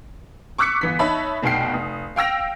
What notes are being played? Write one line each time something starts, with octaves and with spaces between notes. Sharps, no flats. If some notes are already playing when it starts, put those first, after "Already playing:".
C#6 D6 E6 F#6 B6 C#7
G1 E3 B6
D#4 C#5 E5 A5 B5
F1 B1 B2 G5 C7
F1 D#6
F5 G5 E6 A#6 F7